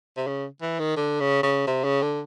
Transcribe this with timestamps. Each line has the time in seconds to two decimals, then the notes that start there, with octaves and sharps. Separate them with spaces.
0.16 C3
0.27 C#3
0.62 E3
0.79 D#3
0.96 D3
1.20 C#3
1.43 C#3
1.67 C3
1.84 C#3
2.02 D3